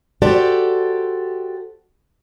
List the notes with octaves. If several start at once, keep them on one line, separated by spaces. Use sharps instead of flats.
F#4 G4 A4 C5 D5